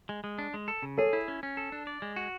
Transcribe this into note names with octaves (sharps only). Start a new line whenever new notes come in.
G#3
G#3
D4
G#3
A4
C#3
G#4 A4 C#5
E4
C#4
C#4
A4
D4
D5
G#3
F#4